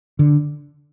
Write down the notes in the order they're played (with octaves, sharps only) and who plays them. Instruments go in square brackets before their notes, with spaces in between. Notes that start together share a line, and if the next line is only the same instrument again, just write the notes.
[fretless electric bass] D3